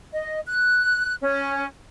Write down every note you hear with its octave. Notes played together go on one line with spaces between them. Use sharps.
D#5
F#6
C#4